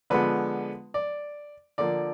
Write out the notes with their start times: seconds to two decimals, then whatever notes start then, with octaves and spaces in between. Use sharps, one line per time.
0.10 D3 F3 G#3 B3 B4
0.94 D5
1.78 D3 F3 A#3 D5